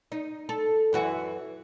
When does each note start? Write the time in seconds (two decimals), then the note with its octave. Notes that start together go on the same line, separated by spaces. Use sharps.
0.12 D#4
0.49 A4
0.93 F#2 E3 F#4